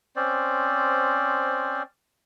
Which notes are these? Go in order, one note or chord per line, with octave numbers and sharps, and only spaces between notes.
C4 C#4 C5 D5